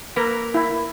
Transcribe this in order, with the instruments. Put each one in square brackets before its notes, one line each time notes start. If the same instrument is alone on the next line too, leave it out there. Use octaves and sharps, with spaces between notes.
[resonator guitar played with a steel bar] A#3 A#4 B4
[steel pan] E4